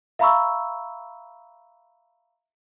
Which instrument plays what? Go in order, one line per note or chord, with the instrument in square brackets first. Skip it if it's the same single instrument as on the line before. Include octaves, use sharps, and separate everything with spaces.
[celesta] E5 F5 A#5 B5 C#6 E6